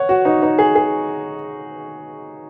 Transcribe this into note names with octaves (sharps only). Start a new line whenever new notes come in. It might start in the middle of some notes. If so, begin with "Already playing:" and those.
Already playing: C#5 F#5
F#4
D#4
D#4
G#4
G#4